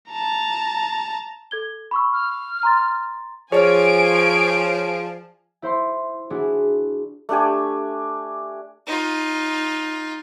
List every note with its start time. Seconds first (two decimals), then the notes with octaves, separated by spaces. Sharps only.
0.10 A5 A#5
1.51 A4 G#6 G7
1.91 B5 C#6 E6
2.13 F6
2.63 A#5 C6 A6
3.52 F3 G#4 C#5 D5 G#5 F6 D7
5.62 E4 C5 E5 C6
6.30 D4 E4 F#4 G#4
7.29 A3 D4 G4 G#5
8.87 D#4 F4